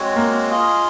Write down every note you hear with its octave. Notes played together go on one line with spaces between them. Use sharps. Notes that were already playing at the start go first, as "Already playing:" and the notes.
Already playing: G#3 C4 F#4 C#5
A#3
F4 G#4 D#5